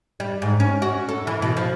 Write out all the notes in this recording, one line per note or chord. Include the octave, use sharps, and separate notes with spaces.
G3
G#2
C#4
F#4
A4
E3
B2
F3